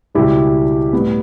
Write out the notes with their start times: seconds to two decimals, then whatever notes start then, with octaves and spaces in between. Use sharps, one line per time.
0.15 C#2 B2 G3 E4 G4
0.93 A2 G3 B3